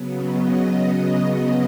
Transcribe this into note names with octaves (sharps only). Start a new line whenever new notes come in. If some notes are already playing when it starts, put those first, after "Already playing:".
Already playing: C#3 F#3 B3
D#5